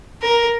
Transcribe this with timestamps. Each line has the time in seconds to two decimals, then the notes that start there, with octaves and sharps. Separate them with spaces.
0.22 A#4